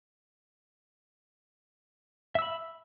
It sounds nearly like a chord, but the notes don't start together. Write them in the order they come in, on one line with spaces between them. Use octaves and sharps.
E5 E6 B5